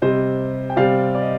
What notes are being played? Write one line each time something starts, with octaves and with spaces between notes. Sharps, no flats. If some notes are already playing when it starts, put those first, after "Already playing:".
C3 G3 C4 C5 D#5
G5
C3 G3 C4 D5 F5
D5
D#5